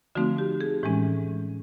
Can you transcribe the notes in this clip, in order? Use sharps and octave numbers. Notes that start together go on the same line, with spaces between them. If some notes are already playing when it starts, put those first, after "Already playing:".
D3 F3 A3 C4 D#4 F#4
G4
G#4
A2 E3 G#3 C#4